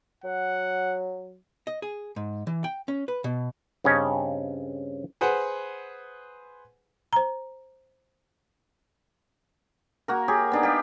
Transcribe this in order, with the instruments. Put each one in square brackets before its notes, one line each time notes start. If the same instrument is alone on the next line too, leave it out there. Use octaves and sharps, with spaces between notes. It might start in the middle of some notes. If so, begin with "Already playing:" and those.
[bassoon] F#3 [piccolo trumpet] F#5
[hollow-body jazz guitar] D#5
G#4
G#2
E3
G5
C#4
B4
B2
[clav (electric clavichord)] G2 C#3 C4 C#4 D#5
[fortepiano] G#4 B4 C5 F#5
[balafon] C5 A#5
[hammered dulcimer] A#3 F#4 A#4
G4 G#4 C#5
B3 D4 D#4
G4 F5 G5